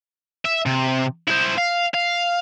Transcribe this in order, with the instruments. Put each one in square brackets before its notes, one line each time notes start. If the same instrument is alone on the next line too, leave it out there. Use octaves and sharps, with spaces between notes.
[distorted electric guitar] E5
C3
E4 C5
F5
F5